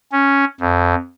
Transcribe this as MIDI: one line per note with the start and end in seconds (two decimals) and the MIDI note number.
0.12 0.45 61
0.60 0.95 41